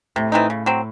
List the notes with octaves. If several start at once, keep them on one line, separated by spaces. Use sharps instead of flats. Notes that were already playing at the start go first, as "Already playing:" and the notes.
A2 C3
E3 C4 D#4
C#3
F#3 C4